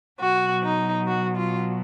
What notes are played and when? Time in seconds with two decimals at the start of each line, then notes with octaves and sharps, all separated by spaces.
0.20 B2 F#3 F#4
0.63 D#4
1.07 F#4
1.36 F4